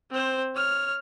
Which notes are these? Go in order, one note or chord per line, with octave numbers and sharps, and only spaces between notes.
C4 C5
C#5 F6